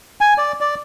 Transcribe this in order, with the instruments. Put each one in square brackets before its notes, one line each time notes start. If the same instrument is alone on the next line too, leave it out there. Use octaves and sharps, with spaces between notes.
[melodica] G#5
D5
D5